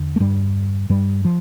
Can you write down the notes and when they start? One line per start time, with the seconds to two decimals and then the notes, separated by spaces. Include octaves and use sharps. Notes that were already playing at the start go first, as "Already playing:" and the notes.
Already playing: E2 D3
0.16 A3
0.20 G2 G3
0.90 G2 G3
1.25 F3